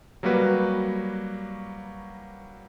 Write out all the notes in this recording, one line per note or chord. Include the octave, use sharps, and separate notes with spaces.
F#3 G3 A#3 F#4 B4